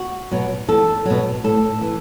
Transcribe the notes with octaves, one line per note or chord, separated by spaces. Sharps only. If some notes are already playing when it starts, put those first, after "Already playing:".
Already playing: F#4
B2 F#3
E2 A4
B2 F#3
A2 A4
E3